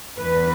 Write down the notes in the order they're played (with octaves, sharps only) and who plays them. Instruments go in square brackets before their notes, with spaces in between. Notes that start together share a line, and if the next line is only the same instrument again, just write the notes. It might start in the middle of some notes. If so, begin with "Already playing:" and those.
[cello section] E2 E3 B4